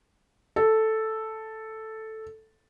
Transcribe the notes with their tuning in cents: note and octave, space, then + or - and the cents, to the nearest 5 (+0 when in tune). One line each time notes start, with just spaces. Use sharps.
A4 +0